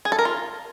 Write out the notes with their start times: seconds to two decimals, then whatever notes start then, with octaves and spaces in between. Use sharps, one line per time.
0.05 G#4
0.12 A4
0.19 A#4
0.25 F4